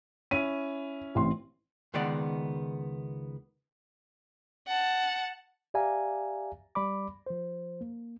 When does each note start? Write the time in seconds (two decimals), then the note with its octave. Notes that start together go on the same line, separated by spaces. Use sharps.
0.31 C#4 E4 D#7
1.15 A1 C4 C6
1.94 C#2 D#3 G#3 B3 D5 F#5
4.67 F#5 A5
5.74 G4 D5 E5 F5 G#5 A#5
6.75 G3 D5 B5 D6
7.26 F3 C5
7.81 A#3